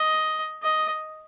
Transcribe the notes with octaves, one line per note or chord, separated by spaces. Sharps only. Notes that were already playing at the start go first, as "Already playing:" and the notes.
Already playing: D#5
D#5